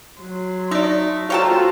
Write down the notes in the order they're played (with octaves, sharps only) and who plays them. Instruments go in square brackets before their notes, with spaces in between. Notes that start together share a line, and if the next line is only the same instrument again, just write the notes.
[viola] F#3 C6
[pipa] A3 [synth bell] D#4 D5
[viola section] F4 F#4 C5 [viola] A4 A#5 [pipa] C#5 G5 A5